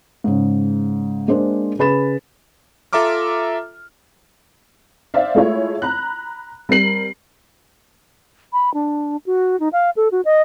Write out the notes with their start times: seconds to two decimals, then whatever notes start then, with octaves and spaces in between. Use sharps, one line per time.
0.24 G#2 C#3
1.28 G#3 A#3 D4 G#4 C5
1.79 C#3 G#4 B4 B5 A6 E7
2.93 F4 A4 E5 A#5 D6 F6
5.14 C5 D5 E5 F5
5.35 G#3 A3 E4 F4 C#5
5.82 A#5 B5 F#6
6.69 G3 C4 A#4 C7 F#7
8.53 B5
8.74 D4
9.26 F#4
9.60 D#4
9.73 F5
9.97 A4
10.12 F#4
10.25 D#5